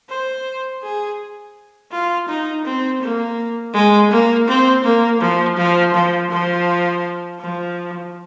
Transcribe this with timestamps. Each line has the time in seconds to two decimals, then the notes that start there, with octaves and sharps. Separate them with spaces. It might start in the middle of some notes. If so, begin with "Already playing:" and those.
0.09 C5
0.82 G#4
1.92 F4
2.28 D#4
2.65 C4
3.02 A#3
3.74 G#3
4.11 A#3
4.47 C4
4.84 A#3
5.20 F3
5.57 F3
5.94 F3
6.30 F3
7.40 F3